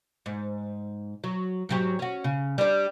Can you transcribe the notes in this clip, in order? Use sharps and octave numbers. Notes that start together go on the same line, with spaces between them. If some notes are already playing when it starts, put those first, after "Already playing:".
G#2
F#3
G#2 F#3 G4
C#4 F#4
C#3
G3 D4